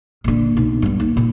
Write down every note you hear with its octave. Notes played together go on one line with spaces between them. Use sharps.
A#2 D3
B1 B3
G2 B3
D#2
A#2